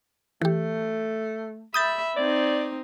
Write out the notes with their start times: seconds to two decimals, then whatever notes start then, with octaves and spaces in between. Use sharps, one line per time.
0.42 E3 A3 G4
1.74 E5 B5 D#6 G6 A6
2.17 C4 D#4 D5